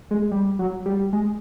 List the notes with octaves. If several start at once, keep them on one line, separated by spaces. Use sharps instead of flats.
G#3
G3
F#3
G3
G#3